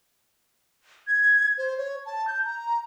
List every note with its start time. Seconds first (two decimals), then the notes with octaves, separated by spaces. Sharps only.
1.07 G#6
1.58 C5
1.78 C#5
2.06 A5
2.28 G6
2.45 A#5